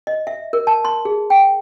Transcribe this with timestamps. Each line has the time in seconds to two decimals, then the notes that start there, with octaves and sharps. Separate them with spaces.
0.07 D#5
0.27 E5
0.53 A#4
0.67 A5
0.85 C6
1.05 G#4
1.30 G5